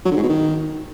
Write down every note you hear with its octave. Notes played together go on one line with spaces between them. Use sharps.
F#3
D3
G#2
B2
D#3